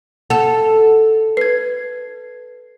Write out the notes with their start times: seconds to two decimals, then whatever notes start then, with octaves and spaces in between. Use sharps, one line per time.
0.30 A4 F#5 E7
1.37 B4 G#6 C7